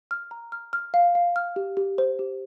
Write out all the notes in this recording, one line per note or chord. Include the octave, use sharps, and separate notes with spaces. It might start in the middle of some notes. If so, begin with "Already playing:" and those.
F6
A#5
F6
F6
F5
F5
F6
G4
G4
C5
G4